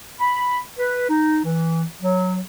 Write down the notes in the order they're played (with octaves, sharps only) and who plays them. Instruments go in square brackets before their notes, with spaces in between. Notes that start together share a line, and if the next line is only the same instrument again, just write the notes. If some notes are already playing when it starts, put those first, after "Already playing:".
[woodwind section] B5
B4
D#4
E3
F#3